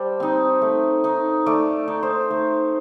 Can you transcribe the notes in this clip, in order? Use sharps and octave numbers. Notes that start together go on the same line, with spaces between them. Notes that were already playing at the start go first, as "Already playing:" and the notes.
Already playing: G3 C5 D5 A5
C4 D#4
A3
D#4
A3 D5
D#4
C5
A3